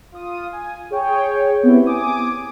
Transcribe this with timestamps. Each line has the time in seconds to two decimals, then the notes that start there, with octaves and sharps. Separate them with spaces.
0.12 F4 D#6
0.53 G#5
0.91 G#4 C#5 G5
1.63 B3 C4 E4 G4
1.86 G#5 D6 D#6